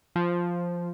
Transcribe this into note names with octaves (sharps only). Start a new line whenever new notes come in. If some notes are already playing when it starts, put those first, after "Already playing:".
F3